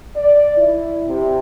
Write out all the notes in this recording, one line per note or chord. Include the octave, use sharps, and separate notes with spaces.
D5
E4
C3